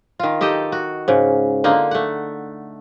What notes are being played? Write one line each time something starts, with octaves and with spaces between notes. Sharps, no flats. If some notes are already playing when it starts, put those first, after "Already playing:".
D#3 F4
D#4 G4 A4 D#5
F#4
G#2 C#3
D3 A#3 D#4 F4
A3 F#5